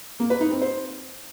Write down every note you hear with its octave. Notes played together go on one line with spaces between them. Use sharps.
A#3
B4
D#4
C4
C5